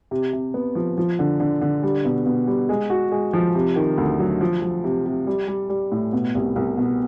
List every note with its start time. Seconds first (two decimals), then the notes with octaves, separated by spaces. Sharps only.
0.11 C3
0.33 C3
0.54 B3
0.75 F3
0.98 F3
1.19 D3
1.40 D3
1.61 D3
1.83 G3
2.05 B2
2.26 B2
2.47 G3
2.69 G#3
2.90 F#4
3.12 G#3
3.33 F3
3.55 C3
3.76 D#3
3.97 D2
4.19 F#3
4.41 F3
4.62 F3
4.84 C3
5.06 C3
5.27 G3
5.48 G3
5.69 G3
5.92 A2
6.13 B2
6.35 C2
6.56 C2
6.77 B2